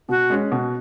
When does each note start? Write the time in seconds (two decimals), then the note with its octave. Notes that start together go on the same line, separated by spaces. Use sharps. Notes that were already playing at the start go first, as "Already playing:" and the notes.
0.09 B2 F#4
0.30 G#3 C#4
0.52 B2